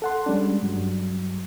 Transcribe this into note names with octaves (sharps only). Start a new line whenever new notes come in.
A4 F#5 C6
G3 G#3 C#4 D4
G2 F#3